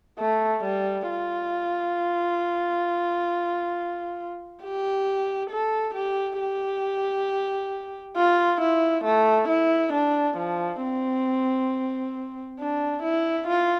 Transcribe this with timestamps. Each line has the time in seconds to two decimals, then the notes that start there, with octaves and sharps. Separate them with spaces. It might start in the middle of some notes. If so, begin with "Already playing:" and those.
0.20 A3
0.64 G3
1.09 F4
4.63 G4
5.50 A4
5.95 G4
6.40 G4
8.17 F4
8.61 E4
9.05 A3
9.49 E4
9.93 D4
10.38 F3
10.82 C4
12.59 D4
13.03 E4
13.48 F4